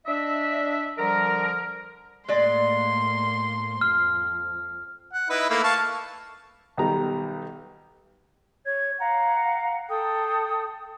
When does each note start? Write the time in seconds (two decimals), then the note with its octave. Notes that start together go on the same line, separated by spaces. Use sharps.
0.06 D4 D#5 E5
0.98 D3 F3 G3 A#4
2.28 A2 G#3 A#3 D5 C6
3.81 F2 F6
5.13 F#5
5.30 D#4 E4 B4
5.49 A3 A#3 E4
5.64 F5 A5 C#6
6.77 B1 D#3 G3 A#5
8.64 C#5 G#6
8.98 F5 F#5 A#5
9.89 A4 G5 D#6